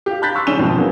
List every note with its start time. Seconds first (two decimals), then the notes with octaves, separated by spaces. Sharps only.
0.06 G4 F5
0.22 A#5 B5 F#6 G6 A6 B6
0.35 C6 C#6 E6
0.47 C2 D#3 C#4 G#4 E7 G7
0.59 F2 G#2 B2 D#3 F3 G#3
0.77 F#3 A#3 B3 C#4 E4 G#4